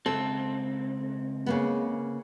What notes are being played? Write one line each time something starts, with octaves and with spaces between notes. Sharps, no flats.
C#2 C4 A4
C#3 A#3 B3